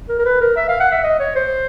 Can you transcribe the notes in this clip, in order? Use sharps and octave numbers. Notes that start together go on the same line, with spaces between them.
A#4
A#4
B4
A#4
E5
F5
F#5
E5
D#5
C#5
C5